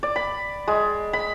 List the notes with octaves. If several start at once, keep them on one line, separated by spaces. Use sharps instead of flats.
D5
B5
G#3
B5